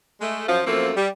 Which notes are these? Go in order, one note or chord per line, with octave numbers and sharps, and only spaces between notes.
G#3 A3
F#2 F3
F#2 F3 A3 A#3 C4
G3